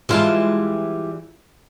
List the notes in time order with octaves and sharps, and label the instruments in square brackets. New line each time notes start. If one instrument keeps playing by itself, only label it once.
[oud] E3 G#3 F4 [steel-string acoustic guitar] G3 E4 A5